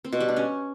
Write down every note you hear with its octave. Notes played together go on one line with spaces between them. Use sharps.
C4
B2
G3
D4
C#4